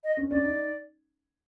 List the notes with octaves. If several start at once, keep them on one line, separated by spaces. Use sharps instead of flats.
D#5
C#4
C#4 D5
D#4